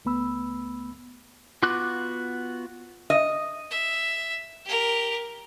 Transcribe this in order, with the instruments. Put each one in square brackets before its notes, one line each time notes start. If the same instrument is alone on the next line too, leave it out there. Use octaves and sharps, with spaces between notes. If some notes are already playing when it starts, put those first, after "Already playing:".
[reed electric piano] C#2 A3 B3 B5 E6
[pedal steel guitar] B3 F4 F#4 D6 F#6
[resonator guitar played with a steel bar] D#5
[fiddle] E5
G4 A#4